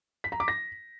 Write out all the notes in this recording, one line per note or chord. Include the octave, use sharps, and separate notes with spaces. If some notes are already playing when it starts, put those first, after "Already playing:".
B6
A#5
D6
A#6